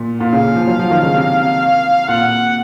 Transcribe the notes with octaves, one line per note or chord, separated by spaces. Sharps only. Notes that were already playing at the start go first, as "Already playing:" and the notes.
Already playing: A#2
A#2 F5
C#3
F3
F#3
F3
D#3
C#3
C3
A#2 F#5